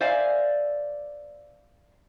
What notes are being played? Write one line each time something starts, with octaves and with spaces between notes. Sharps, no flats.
C5 D5 E5 F5 G#5